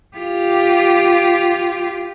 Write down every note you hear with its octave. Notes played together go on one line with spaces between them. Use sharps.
F4 G4